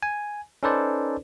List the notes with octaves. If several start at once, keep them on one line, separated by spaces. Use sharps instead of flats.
G#5
C#4 D#4 A4 B4 C5 D5